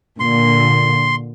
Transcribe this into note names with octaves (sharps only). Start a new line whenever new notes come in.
A#2 D3 C6